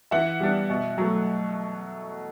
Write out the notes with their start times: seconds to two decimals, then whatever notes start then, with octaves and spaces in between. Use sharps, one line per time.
0.11 E3 E5 F#5
0.40 G3 B3 D4
0.70 B2
0.98 F#3 A3